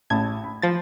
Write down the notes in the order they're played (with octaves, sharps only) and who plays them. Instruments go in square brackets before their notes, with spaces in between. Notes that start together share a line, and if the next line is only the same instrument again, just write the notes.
[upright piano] A1 A5 B5 [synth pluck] G#6
[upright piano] B5
[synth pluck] F3 A6